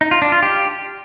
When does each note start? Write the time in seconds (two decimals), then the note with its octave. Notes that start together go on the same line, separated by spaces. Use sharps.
0.01 D#4
0.11 F4
0.22 D4
0.32 F4
0.43 G4